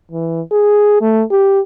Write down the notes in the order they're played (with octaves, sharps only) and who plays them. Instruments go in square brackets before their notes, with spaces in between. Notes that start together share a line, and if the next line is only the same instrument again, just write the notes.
[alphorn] E3
G#4
A3
G4